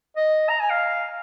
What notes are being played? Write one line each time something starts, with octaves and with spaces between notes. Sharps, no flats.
D#5
A#5
G#5
F5